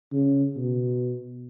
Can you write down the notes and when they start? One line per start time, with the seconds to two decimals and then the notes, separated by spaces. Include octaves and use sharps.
0.13 C#3
0.57 B2